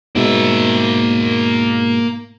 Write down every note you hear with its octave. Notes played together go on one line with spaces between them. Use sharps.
G#2 B2 A#3 E5